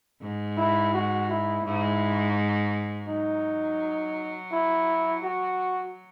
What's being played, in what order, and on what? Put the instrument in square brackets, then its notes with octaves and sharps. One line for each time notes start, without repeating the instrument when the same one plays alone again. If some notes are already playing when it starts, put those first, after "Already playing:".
[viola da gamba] G#2
[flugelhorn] E4
F#4
E4
[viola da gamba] G#2 [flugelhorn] E4
[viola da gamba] F#3 [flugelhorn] D#4
[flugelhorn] E4
F#4